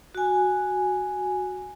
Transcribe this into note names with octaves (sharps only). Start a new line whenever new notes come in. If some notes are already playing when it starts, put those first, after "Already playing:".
F#4 G#5